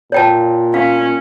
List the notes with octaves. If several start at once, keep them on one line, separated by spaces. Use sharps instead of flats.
A#2 C#5 G5 A5
C#4 F5